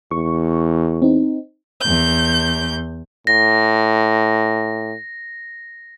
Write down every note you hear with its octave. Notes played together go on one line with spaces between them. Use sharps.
E2 C#6
C4 D#4
E2 G6
A2 A#6